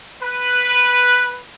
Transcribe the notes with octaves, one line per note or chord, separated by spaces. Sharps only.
B4